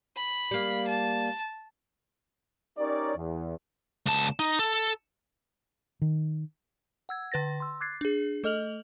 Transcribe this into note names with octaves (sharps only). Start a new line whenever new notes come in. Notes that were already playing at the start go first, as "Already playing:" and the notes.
B5
G3 A#3
A5
C#4 D#4 G4 A#4 C#5 D5
E2
C#2 A5
D#4
A4
D#3
F#5 E6 G#6
D3 B4 A6 A#6
C6 E6
D6 F#6 G#6 A6 C7
D4 G#4
A3 A4 D#5 F6 F7 F#7